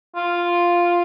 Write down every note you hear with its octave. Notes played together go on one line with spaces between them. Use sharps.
F4